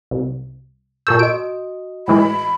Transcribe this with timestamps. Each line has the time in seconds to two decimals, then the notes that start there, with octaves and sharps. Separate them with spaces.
0.11 C2
1.07 A#2 A4 C#6 E6 G6
1.19 F#4 D#5 D7
2.08 A2 E3 G#3 B5